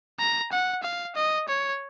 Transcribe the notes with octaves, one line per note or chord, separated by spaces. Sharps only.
A#5
F#5
F5
D#5
C#5